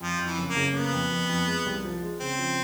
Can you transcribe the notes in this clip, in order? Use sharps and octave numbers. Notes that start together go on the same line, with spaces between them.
F2 F3
F2
E3
F#1
A#3
C#3
A#3 B3
F2
F2
F2
G#3
C2
F3
G#3
C#3 C4
F3